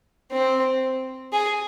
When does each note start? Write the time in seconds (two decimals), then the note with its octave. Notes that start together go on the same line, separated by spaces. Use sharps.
0.31 C4
1.33 G#4